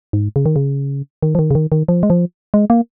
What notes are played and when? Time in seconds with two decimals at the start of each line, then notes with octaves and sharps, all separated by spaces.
0.13 G#2
0.36 C#3
0.46 D#3
0.56 C#3
1.23 D#3
1.35 F3
1.39 D#3
1.51 C#3
1.55 D#3
1.72 D#3
1.88 F3
2.03 G#3
2.10 F3
2.54 G#3
2.70 A#3